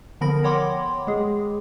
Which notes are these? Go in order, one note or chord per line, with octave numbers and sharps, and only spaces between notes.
D3 F3 B3 A#4 B5 A#6
C#5 F#5 G5 B5 C6 D6
G#3 G#4